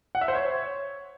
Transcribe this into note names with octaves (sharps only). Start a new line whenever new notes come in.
F#5
E5
C5
C#5